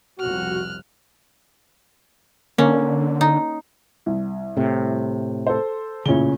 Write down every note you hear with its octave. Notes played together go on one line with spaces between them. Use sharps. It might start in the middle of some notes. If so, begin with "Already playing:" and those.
F1 C2 B2 F#4 F6 F#6
D3 A#3 C#4
D#4
C2
A2 C3
A4 C5
A1 A#2 C#3 C#4 G7